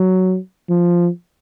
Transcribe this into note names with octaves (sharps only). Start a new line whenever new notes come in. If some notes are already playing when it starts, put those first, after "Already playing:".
Already playing: F#3
F3